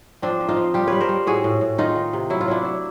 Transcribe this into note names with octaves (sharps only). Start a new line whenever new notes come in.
F3 C4 D4
F3
D#4 F4
F3
G3 F4 G4
G3 B4 C#5
A#4 C5
G3
A2 F#4 G#4
A2
A2
D#3 D#4 F4
D#3
C3
F#3 E4
F4
F#3 D4 E4
F#3